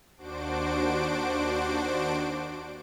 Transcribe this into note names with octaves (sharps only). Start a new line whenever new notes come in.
D#2 D4 F#4 C5 D6 D7